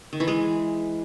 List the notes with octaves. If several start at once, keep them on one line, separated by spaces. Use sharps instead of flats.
D#3
E3
G#3